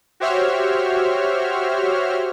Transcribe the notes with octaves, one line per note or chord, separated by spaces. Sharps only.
F#4 G4 C5 C#5 E5 F6